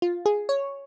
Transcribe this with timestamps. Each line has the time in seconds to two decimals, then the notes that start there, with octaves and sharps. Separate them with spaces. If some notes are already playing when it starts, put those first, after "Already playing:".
0.02 F4
0.26 G#4
0.49 C#5